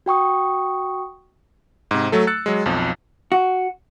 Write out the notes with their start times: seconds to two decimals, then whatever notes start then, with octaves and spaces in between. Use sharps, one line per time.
0.06 F#4 G5 C#6 D#6
1.91 G#2 C3
2.12 F#3 A3 A4
2.27 E6 F#6 A6 C#7
2.46 F#3 G#3
2.66 B1 F2 F3
3.32 F#4